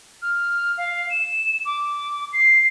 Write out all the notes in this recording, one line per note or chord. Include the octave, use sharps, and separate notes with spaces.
F6
F5
E7
D6
C7